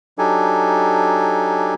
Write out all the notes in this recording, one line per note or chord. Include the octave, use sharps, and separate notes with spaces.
F#3 D4 D#4 G4 A4 G#5